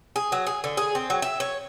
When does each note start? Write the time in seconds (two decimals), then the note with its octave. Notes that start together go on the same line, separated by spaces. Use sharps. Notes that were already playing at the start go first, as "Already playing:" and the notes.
0.16 G#4
0.32 F#3
0.47 G#4
0.64 D3
0.77 G#4
0.95 C4
1.10 F#3
1.22 E5
1.40 C#5